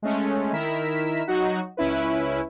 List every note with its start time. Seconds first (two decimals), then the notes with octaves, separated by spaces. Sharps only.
0.02 G#3 A3 C#4
0.53 D#3 E4 A#4 B6 E7
1.27 F#3 D#4 F#4
1.77 C#2 C#4 E4 B4